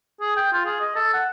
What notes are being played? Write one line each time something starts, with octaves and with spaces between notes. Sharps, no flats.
G#4
G5
F4
G#4
D#5
A4
F#5